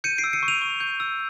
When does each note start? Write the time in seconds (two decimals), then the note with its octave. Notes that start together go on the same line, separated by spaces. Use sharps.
0.04 G6 C#7 D#7
0.18 C7 D7
0.24 E6
0.33 C#7 D#7
0.43 C#6
0.48 D#7 F7
0.62 C#6
0.80 G6
1.00 E6